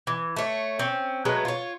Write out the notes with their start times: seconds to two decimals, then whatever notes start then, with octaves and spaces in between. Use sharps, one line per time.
0.07 E3
0.36 A3 C#5
0.79 C4 C#4
1.25 F#3 G#3 A3 B4
1.45 F4 C#5